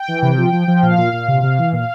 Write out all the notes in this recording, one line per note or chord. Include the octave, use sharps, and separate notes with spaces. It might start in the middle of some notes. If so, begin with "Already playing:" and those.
Already playing: G5
E3
C3
F3
F3
F3
A#2 F5
A#2
A#2
C3
C3
E3
A#2 F5